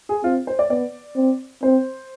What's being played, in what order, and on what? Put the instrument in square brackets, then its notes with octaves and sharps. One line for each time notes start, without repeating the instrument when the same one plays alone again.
[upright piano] G#4
[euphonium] C4 [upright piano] F4
[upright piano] C5
D5
[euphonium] B3 [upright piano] D5
[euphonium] C4
[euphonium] C4 [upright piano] C5